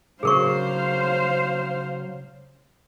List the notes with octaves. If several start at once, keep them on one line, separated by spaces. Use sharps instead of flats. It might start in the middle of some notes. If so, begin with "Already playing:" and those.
C#3 F#3 G#4 A#4 C5 F5 C#6